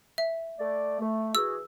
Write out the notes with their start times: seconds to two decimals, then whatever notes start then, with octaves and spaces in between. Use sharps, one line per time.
0.18 E5
0.59 A3 D5
1.00 A3
1.35 E3 F#4 G#4 E6